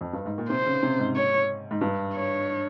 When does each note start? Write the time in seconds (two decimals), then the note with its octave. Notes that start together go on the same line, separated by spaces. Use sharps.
0.01 F2
0.13 G2
0.26 G#2
0.38 A#2
0.50 C3 C5
0.66 C#3
0.83 C3
0.99 G#2
1.16 C#5
1.71 G#2
1.81 G2
2.14 C#5